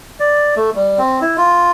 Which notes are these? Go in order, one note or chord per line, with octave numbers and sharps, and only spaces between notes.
D5
A3
G3
C4
E4
F4